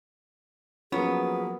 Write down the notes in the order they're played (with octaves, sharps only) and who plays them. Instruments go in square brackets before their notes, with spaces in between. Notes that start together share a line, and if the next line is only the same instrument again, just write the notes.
[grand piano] F3 F#3 A#3 [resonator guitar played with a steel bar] B3 [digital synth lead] C#4 [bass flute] G#4